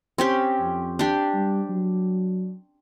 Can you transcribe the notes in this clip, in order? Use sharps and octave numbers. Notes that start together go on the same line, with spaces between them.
C4 C#4 G4
F2
D4 G4
G3
F#3